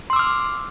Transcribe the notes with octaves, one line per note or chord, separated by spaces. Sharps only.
C6 D6 E6 F6